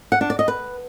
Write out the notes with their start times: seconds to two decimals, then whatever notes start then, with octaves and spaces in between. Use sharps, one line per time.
0.12 F#5
0.21 D4
0.30 D5
0.39 D#5
0.48 B4